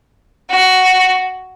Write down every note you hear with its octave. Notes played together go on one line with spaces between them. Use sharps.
F#4